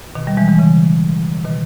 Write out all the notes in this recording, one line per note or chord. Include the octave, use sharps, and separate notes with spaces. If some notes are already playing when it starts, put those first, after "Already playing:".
B2 D#3
D#3 G3
E3 G#3
E3 G#3
C#3 E3
B2 D#3